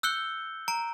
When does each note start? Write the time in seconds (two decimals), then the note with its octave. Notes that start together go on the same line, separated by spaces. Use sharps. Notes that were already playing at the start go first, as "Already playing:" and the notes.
0.03 E6 F#6 G6 C#7 G7
0.68 A#5 D7